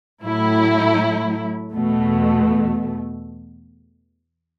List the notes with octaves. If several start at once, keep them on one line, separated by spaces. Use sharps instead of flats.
A2 F#3 A3 E4
E2 B2 A3